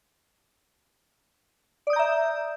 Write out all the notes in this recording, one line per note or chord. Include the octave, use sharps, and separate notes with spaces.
D5 E5 A#5 D#6 G6